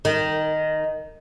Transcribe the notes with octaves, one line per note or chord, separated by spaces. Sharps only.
D#3